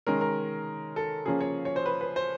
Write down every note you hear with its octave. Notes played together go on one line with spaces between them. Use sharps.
D#3 G#3 C#4 A#4
A#4
A4
C#3 F3 A#3 C#4 G#4
C#5
C#5
C5
B4
B4
C5